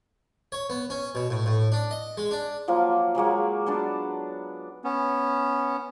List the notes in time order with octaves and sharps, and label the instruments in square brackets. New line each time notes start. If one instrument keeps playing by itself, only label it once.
[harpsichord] C#5
B3
C#4
B2
A2
A2
D4
D#5
G#3
D4
[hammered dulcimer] F3 F#3 A#3 F4
F#3 G#3 A#3 C#5
F#3 B3 D4 A5
[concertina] B3 C#4